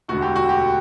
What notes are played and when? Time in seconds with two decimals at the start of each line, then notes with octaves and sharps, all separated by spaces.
0.08 E1 D2 D3 F#4
0.22 G4
0.36 F#4
0.49 G4